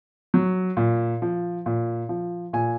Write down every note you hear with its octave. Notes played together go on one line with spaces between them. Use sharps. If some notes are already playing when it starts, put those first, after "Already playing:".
F#3
A#2
F3
A#2
F3
A#2 G#5